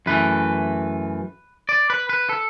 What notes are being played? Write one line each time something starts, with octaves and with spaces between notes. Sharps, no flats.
F#2 E3 A3 B4
D5
B4
B4
A4